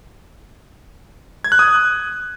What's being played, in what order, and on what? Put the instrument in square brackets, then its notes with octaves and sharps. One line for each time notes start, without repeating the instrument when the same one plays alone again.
[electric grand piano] G#6
F#6
D#6